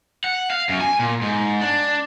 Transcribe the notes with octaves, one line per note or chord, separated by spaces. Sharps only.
F#5
F5
F#2
G#5
A#2
G#2
D4